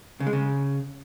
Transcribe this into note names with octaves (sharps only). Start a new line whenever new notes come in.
C#3
G#3
C#3